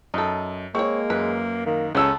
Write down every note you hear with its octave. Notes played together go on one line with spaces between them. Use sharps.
F#2 D#4 A4
G#3 A#3 C4 C#5 C#6
F#2 B4
D#3 A#3
C#2 C#3 B3 C#4 G#4 A4 E6